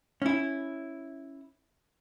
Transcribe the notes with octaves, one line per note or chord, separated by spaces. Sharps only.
C#4 E4